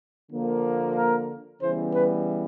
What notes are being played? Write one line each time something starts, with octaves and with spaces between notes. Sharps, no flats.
D3 F3 A#3
A#4
C#3 E3 G3 B3 C5
B4